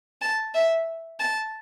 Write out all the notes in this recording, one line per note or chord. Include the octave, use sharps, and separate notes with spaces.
A5
E5
A5